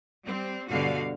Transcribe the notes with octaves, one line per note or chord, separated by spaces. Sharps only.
G3 C4
G2 B2 D3 G3 F#4 F5